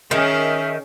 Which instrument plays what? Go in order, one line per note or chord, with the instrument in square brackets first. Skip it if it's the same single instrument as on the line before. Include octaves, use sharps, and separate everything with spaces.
[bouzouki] D#3 [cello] C#4 G#4 [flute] E5